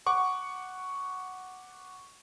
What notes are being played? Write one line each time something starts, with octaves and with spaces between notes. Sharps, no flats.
F#5 C#6 D6